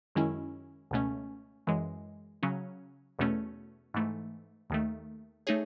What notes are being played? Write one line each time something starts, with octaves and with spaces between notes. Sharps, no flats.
F#2 D#3 G#3 C#4 E4
C#2 B2 A3 C#4
F#2 E3 G#3
C#3 F#3 C#4
E2 B2 A3 C#4
G#2 E3 A3
D#2 D#3 A3
A3 D#4 G#4 C#5